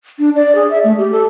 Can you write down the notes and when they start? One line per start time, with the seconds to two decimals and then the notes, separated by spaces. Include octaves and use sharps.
0.19 D4
0.35 D5
0.55 G#4
0.71 E5
0.84 A3
0.98 G4
1.12 A4